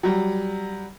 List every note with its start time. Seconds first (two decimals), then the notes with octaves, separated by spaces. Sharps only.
0.03 F#3 G3